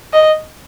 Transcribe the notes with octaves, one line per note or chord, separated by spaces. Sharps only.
D#5